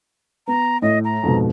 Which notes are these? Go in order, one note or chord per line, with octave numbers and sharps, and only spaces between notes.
B3 A#5
A2 D#5
A#5
F2 G#2 B2